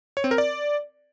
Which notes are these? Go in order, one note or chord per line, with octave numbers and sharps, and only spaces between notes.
C#5
C4
A#4
D5